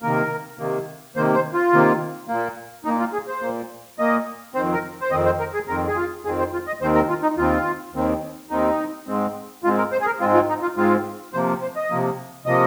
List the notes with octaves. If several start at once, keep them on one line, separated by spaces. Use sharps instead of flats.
C3 D#3 A#3 A#4
C3 D#3 A#3
C3 D#3 A#3 C5
C5
F4
C3 D#3 A#3
A#2 A#3
A#2 A#3 D#4
F4
G#4
C5
A#2 A#3
A#2 A#3 D#5
F2 D#3 C4 C5
A#4
C5
F2 D#3 C4 D#5
C5
A#4
G#4
F2 D#3 C4 A#4
G#4
F4
F2 D#3 C4 G#4
C5
F4
D#5
D#2 D#3 C4 C5
A#4
F4
D#4
D#2 D#3 C4 F4
D#2 D#3 C4
D#2 D#3 C4 D#4
G#2 G#3 C4
G#2 G#3 C4 F4
A#4
C5
G#4
A#4
G#2 G#3 C4 F4
F4
D#4
F4
G#2 G#3 C4 F4
C3 F3 A#3 C5
C5
D#5
C3 F3 A#3
C3 F3 A#3 D#5